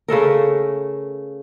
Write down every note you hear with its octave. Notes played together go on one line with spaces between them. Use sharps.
C#3 A3 A4 A#4